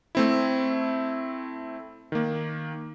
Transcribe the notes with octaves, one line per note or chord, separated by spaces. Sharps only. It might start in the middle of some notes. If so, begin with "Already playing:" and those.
A3 C4 E4
D#3 A#3